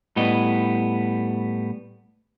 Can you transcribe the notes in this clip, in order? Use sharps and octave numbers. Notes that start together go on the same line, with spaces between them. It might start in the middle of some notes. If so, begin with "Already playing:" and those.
A2 G3 B3 D#5